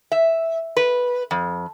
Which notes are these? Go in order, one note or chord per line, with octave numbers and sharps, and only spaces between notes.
E5
B4
F2